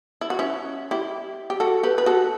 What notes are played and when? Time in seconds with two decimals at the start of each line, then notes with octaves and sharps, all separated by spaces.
0.21 E4
0.30 F#4
0.39 C#4 E4
0.91 E4 G4
1.50 G4
1.60 F#4 A4
1.83 G4 B4
1.98 B4
2.06 F#4 A4